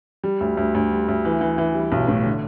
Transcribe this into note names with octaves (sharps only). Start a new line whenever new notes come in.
G3
D2
D2
D2
G3
D2
E3
E3
E3
G3
B1
A2
D3